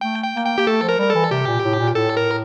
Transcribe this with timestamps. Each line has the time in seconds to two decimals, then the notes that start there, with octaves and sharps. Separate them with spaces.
0.01 A3 G5
0.23 G5
0.34 A#3
0.45 G5
0.58 A#3 G4
0.67 A3 A4
0.83 F3
0.89 A#4
0.99 G3 A#4
1.10 E3 A4
1.31 C3 G4
1.47 A#2
1.64 A2
1.79 A#2
1.95 A2 A4
2.17 A#4